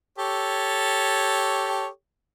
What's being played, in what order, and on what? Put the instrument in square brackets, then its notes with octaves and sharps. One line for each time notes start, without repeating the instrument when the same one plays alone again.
[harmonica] G4 A4 C#5